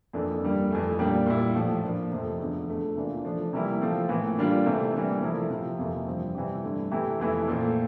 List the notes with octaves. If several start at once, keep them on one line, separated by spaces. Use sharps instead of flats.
F2 E3 A#3 D4 A4
G2 D3 G3 A#3
F2 E3 A3
A#2 G3 A#3 D4 G4
A#2 G3 A#3 E4
A2 F3 A3
F3 A#3 D4
F2 C3 F3 A3 C4
E2 D3 F3
E2 D3 A3
C3 E3 A#3 D4 F4
F3 A3 D4
C3 E3 G3 A#3 E4
F3 A3 C4 F4 A4
A2 E3 A#3
D3 G3 A#3 D4 F4
C3 E3 A3 C4
E3 G3 A#3 D4
C3 F3 A3 E4 A#4
C3 F3 C4
F2 C3 E3 A#3 F4
G2 F3 C4
C3 E3 G3 C4 G4
G2 D3 A3
C3 E3 A3 E4 G4
F2 E3 A3 E4
A#2 A3 C4